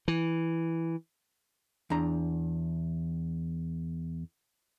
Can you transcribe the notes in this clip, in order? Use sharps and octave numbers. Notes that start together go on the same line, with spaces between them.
E3
E2 D4 A#5